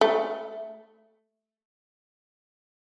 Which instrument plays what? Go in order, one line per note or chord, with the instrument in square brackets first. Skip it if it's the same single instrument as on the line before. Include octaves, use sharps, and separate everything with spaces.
[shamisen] A3